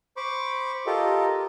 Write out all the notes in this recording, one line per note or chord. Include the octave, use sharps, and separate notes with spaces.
C5 B5 C#6 D6
F4 G4 A4 A#4 D#5